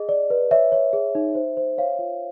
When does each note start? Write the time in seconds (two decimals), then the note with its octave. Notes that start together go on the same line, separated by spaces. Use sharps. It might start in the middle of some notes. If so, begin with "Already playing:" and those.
Already playing: G#4 D#5
0.09 D5
0.30 B4
0.51 C#5 E5
0.72 C#5
0.93 G#4
1.15 D#4
1.35 C5
1.57 C5
1.78 C#5 F5
1.99 F4